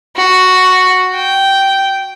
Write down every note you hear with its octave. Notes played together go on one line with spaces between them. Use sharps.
F#4
G5